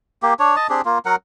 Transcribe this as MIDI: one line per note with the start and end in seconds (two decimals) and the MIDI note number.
0.23 0.34 58
0.23 0.34 67
0.40 0.56 62
0.40 0.56 73
0.56 0.67 75
0.56 0.67 81
0.69 0.81 60
0.69 0.81 62
0.69 0.81 67
0.69 0.81 68
0.85 0.99 58
0.85 0.99 65
1.06 1.16 54
1.06 1.16 70
1.06 1.16 78